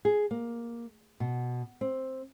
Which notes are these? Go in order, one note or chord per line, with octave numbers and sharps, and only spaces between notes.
G#4
A#3
B2
C4